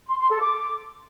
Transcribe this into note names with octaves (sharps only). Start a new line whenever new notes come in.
C6
C6
A4
D6